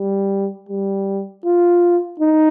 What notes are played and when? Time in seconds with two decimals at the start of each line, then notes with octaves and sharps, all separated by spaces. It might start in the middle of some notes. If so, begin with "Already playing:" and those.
Already playing: G3
0.69 G3
1.45 F4
2.20 D#4